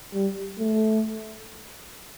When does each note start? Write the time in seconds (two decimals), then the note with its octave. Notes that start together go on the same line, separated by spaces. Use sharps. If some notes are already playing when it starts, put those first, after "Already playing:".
0.14 G3
0.59 A3